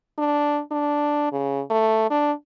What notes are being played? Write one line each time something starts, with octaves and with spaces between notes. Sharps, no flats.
D4
D4
C#3
A3
D4